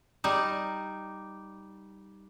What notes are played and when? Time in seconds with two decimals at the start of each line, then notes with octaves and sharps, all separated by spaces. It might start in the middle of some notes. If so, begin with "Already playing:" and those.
0.24 G3 D#4